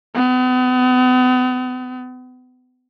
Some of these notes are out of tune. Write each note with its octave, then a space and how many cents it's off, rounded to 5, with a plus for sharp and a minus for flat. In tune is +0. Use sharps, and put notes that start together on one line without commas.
B3 +40